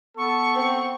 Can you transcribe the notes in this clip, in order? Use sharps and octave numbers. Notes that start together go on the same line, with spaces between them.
B3 A4 C#6
C4 C5